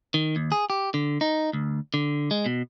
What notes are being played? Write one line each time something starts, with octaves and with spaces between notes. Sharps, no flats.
D#3
D#2
G#4
G4
D3
D#4
D2
D3
G#3
B2